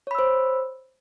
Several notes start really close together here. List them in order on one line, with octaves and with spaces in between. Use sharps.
C#5 B5 E6 C5